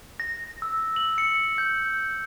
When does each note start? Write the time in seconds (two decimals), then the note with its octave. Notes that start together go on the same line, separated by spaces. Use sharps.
0.20 A#6
0.62 E6
0.96 F#7
1.18 C#7
1.58 G6